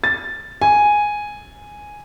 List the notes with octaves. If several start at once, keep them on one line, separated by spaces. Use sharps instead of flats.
A6
G#5